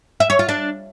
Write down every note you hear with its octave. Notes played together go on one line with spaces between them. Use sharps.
E5
C#5
F4
D4